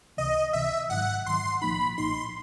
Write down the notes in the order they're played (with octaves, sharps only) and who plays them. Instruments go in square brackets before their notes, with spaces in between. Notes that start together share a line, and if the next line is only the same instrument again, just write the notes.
[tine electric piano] C#2 C3 E3 [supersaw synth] D#5
[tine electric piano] C#2 C3 E3 [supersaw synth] E5
[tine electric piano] G#1 G#2 D#3 F#3 [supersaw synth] F#5
[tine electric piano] G#1 G#2 D#3 F#3 [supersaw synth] C6
[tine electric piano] B1 A#2 F3 A#3 D#4 [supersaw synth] B5
[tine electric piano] B1 A#2 F3 A#3 D#4 [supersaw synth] C6